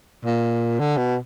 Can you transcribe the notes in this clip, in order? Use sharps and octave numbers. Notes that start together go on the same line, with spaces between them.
A#2
D3
B2